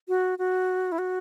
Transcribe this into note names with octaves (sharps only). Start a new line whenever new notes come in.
F#4
F#4
E4
F#4